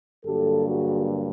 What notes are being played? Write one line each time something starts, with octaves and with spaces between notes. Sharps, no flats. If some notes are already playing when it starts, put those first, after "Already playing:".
G2 D3 F#3 A#3 G4 A4
F#4 G#4